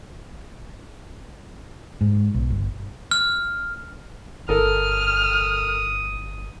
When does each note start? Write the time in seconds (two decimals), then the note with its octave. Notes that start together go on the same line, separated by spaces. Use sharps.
2.01 G#2
2.34 B1
2.50 G1
3.11 F6
4.49 G1 A4 A#4 D#6 F6